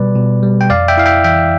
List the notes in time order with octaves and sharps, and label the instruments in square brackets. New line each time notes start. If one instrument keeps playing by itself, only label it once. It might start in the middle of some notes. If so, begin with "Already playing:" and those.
Already playing: [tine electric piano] B2 G3 B4 D5
B2
G3
G5
F2 D5 F5
E5 G5
E4 F5
E5 G5
E3 E5 G5